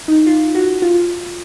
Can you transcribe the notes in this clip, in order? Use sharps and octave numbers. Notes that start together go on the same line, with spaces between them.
D#4
F4
F#4
F4